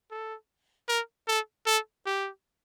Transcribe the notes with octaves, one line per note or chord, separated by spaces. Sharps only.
A4
A#4
A4
A4
G4